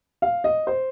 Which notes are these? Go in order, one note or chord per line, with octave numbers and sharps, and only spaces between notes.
F5
D#5
C5